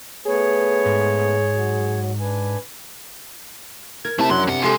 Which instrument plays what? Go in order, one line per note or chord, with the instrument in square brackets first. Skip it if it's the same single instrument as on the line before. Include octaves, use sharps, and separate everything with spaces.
[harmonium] A3 B3 B4 [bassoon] G#4 [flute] C#5
[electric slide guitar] G#2
[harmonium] F#3 F#4
D4 B4 G#5
[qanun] A#4 [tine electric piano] G#6
[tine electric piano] C3 [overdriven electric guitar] A3 A5 [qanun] E4
[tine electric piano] F#2 F#3 F#6 [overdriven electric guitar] F3 C6 [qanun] D4
[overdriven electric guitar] E2 F#5 [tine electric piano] C3
[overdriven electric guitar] G#3 [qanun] G4 A4 C6